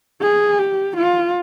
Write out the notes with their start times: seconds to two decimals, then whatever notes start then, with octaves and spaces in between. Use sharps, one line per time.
0.22 G#4
0.59 G4
0.97 F4